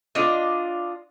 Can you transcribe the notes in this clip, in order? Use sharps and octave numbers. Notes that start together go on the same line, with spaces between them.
D4 F4 D#5